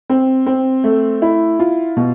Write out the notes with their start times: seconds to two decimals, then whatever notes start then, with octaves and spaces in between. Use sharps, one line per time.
0.10 C4
0.46 C4
0.84 A3
1.22 E4
1.59 F4
1.97 B2